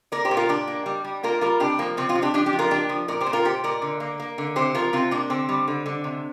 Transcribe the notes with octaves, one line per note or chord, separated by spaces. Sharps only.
A#3 A#4 D5
G4 C5
A#2
F4 A#4
A#2 D4 G4
A#3
G3
G3
A#3 F4 A#4
G3 F4 A#4
C3 D4 G4
F3 A#3
C3 C4
C4 F4
C3
D4 G4
F3 D4 G4
D4 G4
F3
F4 A#4
A#3 D4 G4
F3
A#2 A#4 D5
G4 C5
A#2
F4 A#4
A#2 G4 C5
A#2 A#4 D5
D3
A#3
A#3
D3
C3 G4 C5
F3 F4 A#4
C3 C4 F4
C3 A#3 D4
D3 C4
G3
D3
D3
C3